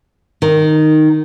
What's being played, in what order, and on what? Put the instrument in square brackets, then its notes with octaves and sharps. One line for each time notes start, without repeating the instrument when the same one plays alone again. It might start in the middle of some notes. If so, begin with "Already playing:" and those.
[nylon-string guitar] D#3